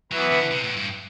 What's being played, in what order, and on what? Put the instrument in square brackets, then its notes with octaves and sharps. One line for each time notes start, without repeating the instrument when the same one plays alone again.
[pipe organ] E3 B3 E4 B4 [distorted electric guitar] F#3
[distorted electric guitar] D3
C3
A2
G2